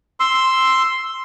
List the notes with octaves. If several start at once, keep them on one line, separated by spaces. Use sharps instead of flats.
C6 E6